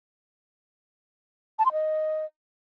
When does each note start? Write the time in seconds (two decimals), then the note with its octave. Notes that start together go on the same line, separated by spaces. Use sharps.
1.59 A5
1.65 C6
1.72 D#5